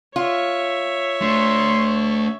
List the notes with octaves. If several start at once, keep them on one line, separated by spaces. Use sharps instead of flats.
F4 C#5 E5
A3 D4 C6